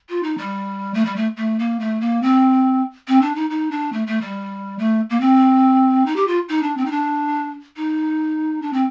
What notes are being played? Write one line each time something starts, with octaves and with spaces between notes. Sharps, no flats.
F4
D#4
G3
A3
G3
A3
A3
A#3
A3
A#3
C4
C4
D4
D#4
D#4
D4
A3
A3
G3
A3
A#3
C4
D#4
G4
F4
D#4
D4
C4
D#4
D4
D#4
D4
C4